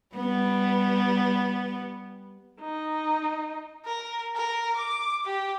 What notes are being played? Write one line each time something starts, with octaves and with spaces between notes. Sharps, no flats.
G3 B3
D#4
A#4
A#4
D6
G4